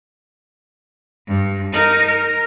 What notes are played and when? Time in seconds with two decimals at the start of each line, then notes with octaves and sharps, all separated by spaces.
1.27 G2
1.73 D#4 A#4
2.07 A#4